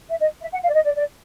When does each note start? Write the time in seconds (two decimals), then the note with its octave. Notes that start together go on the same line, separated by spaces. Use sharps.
0.10 E5
0.21 D#5
0.42 E5
0.53 F#5
0.63 F5
0.69 D5
0.74 D#5
0.85 D5
0.96 D5